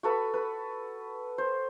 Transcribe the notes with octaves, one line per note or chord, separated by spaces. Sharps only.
F#4 A4 B4 B5
B4
C5